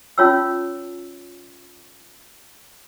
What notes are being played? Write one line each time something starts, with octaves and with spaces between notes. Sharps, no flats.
C#4 F4 C#5 A5 E6